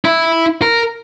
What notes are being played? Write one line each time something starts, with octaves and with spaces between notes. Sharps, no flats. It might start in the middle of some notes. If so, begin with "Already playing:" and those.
E4
A#4